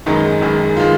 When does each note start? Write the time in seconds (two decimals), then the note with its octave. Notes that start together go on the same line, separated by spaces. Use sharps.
0.06 F#1 F#2 D#3 G#3 D#4
0.41 F#1 F#2 D#3 G#3
0.77 F4
0.80 D#3 G#3